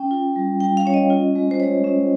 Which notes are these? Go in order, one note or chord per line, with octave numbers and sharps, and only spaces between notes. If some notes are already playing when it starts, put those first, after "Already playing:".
Already playing: C#4 G5
F4
G3
G3 G5
F5
C#4 C#5
D#5
F4
G#3
C5
G#3 C#5
C#4